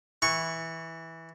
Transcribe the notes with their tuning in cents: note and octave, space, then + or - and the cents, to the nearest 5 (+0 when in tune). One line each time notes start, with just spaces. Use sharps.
E3 -10 C#6 +0